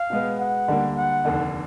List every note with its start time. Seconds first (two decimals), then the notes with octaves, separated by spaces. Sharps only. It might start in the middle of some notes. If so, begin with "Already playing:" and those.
Already playing: F5
0.10 B2 G#3 B3
0.40 F#5
0.68 D2 D3 G3 A#3
0.97 F#5
1.25 F1 D#2 D3